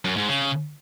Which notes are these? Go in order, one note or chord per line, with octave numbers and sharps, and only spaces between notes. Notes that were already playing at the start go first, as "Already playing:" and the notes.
F#2
G#2
C#3